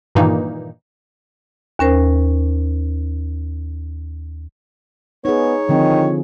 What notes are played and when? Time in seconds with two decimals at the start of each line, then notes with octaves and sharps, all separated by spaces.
0.15 G2 A#2 D#3 E3 A#3 D#4
1.79 D#2 C#4 A#4 C5
5.25 B3 D#4 G#4 C#5
5.69 D3 D#3 F3 C4